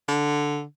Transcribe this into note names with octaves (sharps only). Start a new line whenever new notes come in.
D3